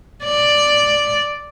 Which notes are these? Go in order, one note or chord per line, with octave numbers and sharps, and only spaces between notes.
D5